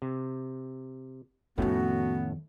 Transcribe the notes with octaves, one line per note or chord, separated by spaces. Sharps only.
C3
F2 A2 D#3 A3 B3 C#4 F#4